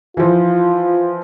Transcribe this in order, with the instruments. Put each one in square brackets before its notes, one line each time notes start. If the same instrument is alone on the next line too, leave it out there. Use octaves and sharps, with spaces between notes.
[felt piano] E3 F3 [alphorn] F4